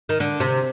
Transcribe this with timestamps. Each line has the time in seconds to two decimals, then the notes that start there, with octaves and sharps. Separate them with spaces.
0.09 D#3
0.20 D3
0.40 C3